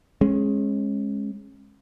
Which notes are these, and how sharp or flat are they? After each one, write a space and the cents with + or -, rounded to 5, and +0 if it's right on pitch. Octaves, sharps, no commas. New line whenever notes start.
G#3 +0 C#4 -30